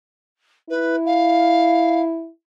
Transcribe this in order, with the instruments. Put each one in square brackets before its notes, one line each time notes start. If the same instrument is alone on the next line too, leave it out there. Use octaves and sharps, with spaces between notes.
[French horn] E4 [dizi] B4
[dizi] F5